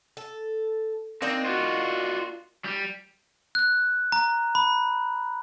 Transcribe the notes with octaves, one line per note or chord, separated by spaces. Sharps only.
A4
A#3 C4 D4 D#4
F4 F#4
G3
F#6
A#5
B5